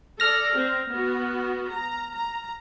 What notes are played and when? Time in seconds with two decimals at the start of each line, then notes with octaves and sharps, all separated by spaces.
0.20 A4 D5 F6 A#6
0.57 C4
0.91 B3 F#4
1.72 A#5
2.14 A#5